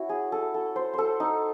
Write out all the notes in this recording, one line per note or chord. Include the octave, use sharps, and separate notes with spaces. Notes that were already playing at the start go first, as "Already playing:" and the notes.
Already playing: C#4 E4 F#4
G#4
A4
A4
C5
A4 C5
D#4